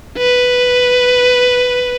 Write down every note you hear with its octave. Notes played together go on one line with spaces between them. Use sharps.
B4